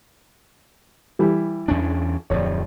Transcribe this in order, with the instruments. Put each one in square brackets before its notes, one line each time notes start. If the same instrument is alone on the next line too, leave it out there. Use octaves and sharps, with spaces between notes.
[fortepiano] E3 G3 E4
[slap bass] E2 C#4 D4
[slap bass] D1 F2 F3 [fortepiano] C#5 D5